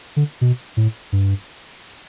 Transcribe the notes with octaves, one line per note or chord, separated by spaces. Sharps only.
D3
B2
A2
G2